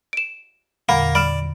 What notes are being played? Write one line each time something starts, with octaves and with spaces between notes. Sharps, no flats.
D7 E7
E2 A#2 D3 A#3 F#5 B5
D5 B5 F6 E7